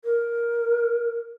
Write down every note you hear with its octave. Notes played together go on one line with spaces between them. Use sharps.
A#4